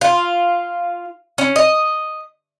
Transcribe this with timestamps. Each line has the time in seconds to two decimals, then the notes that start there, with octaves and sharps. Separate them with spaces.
0.01 F4
1.38 C#4
1.56 D#5